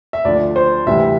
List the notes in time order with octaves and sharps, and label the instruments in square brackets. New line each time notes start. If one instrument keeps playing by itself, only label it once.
[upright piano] E5
D2 D3 F3 D5
C5
D2 C3 E3 G3 E5